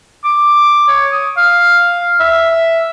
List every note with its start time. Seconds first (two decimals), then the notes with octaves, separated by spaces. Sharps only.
0.25 D6
0.89 C#5
1.12 D#6
1.37 F5
2.21 E5